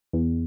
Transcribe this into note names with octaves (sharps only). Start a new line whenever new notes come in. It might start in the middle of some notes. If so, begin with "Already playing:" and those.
E2